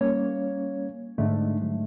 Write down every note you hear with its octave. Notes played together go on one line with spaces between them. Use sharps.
G3 A#3 C#4 C#5
G#2 D3 G#3 A3 D4
F#3